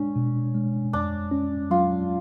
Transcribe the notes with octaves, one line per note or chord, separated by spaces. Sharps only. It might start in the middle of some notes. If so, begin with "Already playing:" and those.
Already playing: G#3 C#4 D4
B2
G#3
F2 D4
C#4
F#3 F4